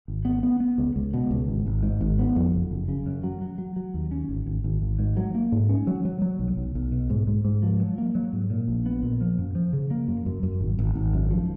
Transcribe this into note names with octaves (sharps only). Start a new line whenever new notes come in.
G#1
B3
B3
B3
C#2
C#2
B2
C#2
G#1
G#1
G#2
G#1
B3
F2
F#1
F#1
C#3
F#2
F#3
F#3
F#3
F#3
D#2
C#4
G#1
G#1
G#1
G#1
G#2
F#3
A#3
G#2
C#4
F#3
F#3
F#3
B1
B1
B1
B2
G#2
G#2
G#2
F3
F#3
A#3
F#3
G#2
A#2
A#1
B3
A#2
F3
F#2
F3
C#3
A#3
F#2
F#2
F#2
G#1
G#1
G#1
F#2
F3